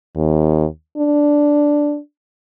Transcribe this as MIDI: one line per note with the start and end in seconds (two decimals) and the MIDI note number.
0.16 0.65 39
0.97 1.99 62